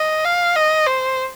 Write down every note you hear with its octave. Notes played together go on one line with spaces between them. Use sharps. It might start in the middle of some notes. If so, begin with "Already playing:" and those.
Already playing: D#5
F5
D#5
C5